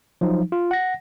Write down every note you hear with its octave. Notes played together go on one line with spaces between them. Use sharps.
F3 F#3 D#4
F4
F#5 A#6